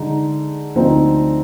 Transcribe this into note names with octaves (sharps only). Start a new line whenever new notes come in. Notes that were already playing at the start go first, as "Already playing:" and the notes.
Already playing: D3 G#3 D#4
D2 D3 F3 C4 D#4